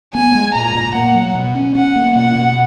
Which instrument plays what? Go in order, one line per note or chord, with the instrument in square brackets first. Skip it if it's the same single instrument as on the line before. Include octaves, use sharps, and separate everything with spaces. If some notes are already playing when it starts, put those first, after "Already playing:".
[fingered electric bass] B3 [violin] G#5
[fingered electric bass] G#3
[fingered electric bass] A#2 [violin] A#5
[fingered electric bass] A#2
[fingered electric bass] A#3 [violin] F#5
[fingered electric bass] F#3
B2
C#4
[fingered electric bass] C#4 [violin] F#5
[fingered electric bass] A#3
[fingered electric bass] B2 [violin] F#5
[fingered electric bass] B2